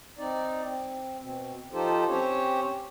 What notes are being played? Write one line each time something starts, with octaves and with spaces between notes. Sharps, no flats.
C4 D#4 D5
C4
B2 C4
F3 D#4 F4 G4 A4 C5
C4 C#4 G4 C5 C#5